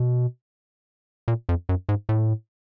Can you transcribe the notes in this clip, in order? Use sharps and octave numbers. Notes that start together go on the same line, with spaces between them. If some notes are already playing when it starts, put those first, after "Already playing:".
Already playing: B2
A#2
F2
F#2
G#2
A2